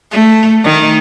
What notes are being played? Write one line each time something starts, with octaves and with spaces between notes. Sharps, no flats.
A3
D#3